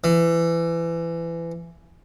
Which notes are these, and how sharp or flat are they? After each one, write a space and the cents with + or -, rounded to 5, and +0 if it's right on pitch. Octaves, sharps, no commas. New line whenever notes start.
E3 +25